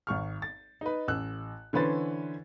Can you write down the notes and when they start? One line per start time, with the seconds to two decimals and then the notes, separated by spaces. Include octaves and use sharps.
0.07 G#1 C#6 F6
0.42 A6
0.81 D#4 B4
1.08 A1 E6 F#6
1.73 D3 E3 C#4 B4 C5 A6